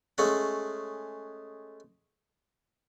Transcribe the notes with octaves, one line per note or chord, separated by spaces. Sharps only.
G#3 A3 C#4 F#5